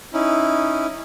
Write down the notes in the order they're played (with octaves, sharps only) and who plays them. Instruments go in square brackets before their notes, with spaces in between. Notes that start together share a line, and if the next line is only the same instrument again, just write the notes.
[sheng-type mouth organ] C#4 D#4 E4